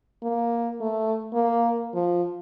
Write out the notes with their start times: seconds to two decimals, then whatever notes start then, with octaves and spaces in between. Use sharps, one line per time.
0.22 A#3
0.81 A3
1.33 A#3
1.94 F3